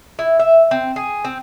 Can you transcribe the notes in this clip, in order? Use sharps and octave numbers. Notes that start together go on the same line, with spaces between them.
E4
E5
C4
G#4
C4